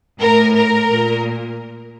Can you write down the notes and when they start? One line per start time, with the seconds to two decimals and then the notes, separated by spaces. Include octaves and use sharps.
0.20 A2 A#4
0.55 A#4
0.88 A#2